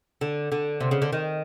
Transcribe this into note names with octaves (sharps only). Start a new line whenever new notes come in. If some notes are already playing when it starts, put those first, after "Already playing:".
D3
D3
C3
C#3
D3
D#3